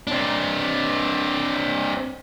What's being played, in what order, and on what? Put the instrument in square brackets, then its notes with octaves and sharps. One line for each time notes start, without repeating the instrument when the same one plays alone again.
[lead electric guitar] C4 D4